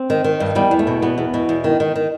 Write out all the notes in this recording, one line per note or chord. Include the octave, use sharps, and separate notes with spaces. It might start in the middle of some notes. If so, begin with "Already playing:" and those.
Already playing: C4
D#3
D#3
G2
E2 G3
E2
A3
B2
E2 B3
E2
B2
E2
D#3
D#3
D#3